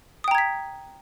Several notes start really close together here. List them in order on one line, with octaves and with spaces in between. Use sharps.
D#6 G5 A#5 G#6 B6